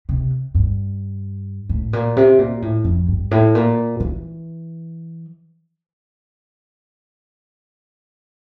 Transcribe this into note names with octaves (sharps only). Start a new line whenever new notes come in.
C3
G2
A2
A#2
C3
A#2
A2
F2
G2
A2
A#2
E3